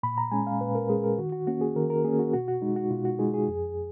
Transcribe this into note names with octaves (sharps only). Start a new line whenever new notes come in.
A#2 B5
A#5
G#3 C#4 G#5
F5
A#2 B4
A#4
G#3 C#4 G#4
A#4
D#3 F#4
F#4
A#3 C#4 F#4
G#4
D#3 A#4
A#4
A#3 C#4 G#4
F#4
B2 F#4
F#4
G#3 D#4
F#4
B2 F4
F#4
G#3 D#4 G#4
G#4
F2